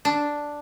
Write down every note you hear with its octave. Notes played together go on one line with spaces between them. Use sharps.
D4